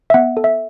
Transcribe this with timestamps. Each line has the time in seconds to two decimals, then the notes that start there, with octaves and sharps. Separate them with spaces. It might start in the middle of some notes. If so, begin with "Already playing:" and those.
0.10 E5
0.14 B3 F#5
0.37 A4
0.44 E5